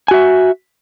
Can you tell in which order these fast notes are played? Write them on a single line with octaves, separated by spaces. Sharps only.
G#5 F#4 E5